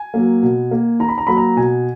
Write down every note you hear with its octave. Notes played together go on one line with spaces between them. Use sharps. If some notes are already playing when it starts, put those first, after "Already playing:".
Already playing: G#5
F#3 A#3
B2
A#3
D#3 A#5
B5
A#5
F#3 A#3 B5
A#5
B2 G#5